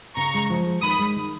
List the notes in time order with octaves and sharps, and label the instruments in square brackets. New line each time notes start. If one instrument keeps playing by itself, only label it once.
[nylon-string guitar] C#3 [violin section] A#5 C#6
[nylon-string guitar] G#3
F3
G#3
[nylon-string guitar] D#3 [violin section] B5 D#6
[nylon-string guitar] G#3
D#3